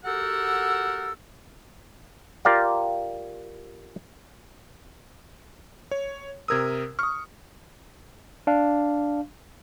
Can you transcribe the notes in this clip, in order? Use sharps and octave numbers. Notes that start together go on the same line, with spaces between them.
F#4 G4 A4 A#4 F#5 E6
F4 G4 A#4 D5 F5
C#5
C3 A#4 D#6 E6 G#6
C#6 D#6 F6
D4 F5